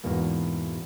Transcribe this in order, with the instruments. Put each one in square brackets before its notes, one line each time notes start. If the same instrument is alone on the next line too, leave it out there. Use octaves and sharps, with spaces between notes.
[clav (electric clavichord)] E2 G#2 B2 A#3